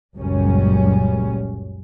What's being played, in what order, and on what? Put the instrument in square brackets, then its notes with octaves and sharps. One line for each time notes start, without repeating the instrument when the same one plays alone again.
[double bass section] F#1 C#2 F#2 A#2 G3 C#4